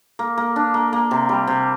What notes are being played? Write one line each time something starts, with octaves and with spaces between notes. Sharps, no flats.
A#3
A#3
D4
A#3
A#3
C3
G3
C3